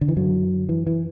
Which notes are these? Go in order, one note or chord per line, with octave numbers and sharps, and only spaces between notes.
D3
E3
F#2 D3 F#3
E3
E3